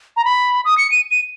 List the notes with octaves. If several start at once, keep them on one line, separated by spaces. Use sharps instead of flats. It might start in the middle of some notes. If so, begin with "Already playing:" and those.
A#5
B5
D#6
C#7
D#7
D#7